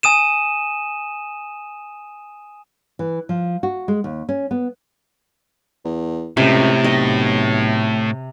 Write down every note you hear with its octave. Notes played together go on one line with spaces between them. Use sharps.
G#5 D#6 D#7 E7
E3
F3
F#4
G#3
D#2
C#4
B3
E2
C#2 A2 C3
B1 D#5